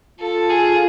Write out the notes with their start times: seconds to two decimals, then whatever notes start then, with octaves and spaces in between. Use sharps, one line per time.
0.19 F4 A4
0.50 G#4